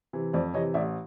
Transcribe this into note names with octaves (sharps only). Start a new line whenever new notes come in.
C3 E3
F2 C5 D5
C3 E3 C#5 D#5
A1 D5 E5